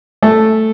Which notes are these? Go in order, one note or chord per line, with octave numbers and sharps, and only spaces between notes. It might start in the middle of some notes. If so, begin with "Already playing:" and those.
A3